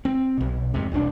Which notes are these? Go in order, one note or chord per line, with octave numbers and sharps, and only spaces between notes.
C4
B1 B2
F2 G#2 C3
E1 C2 A#2 D4